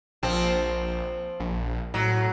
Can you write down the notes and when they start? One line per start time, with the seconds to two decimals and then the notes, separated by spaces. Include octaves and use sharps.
0.23 A#1 F3 C4
1.40 A#1
1.94 A2 F#3